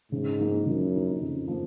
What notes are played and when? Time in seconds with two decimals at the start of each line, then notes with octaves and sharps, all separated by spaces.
0.12 G#2 C#3
0.40 F3 A#3 D#4
0.66 F#2 C#3
0.94 F3 A#3 D#4
1.21 F2 C#3
1.48 F3 A#3